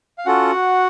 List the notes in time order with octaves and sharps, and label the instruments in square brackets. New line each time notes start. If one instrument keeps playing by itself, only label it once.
[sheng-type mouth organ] F5
C#4 F4 F#4 A4 F#5